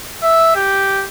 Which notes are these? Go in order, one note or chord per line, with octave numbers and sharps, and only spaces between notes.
E5
G4